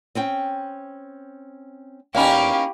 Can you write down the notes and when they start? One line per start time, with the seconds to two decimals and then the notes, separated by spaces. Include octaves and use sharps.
0.15 C4 C#4 G5
2.15 E2 A#3 C#4 D#4 G4 F5 B5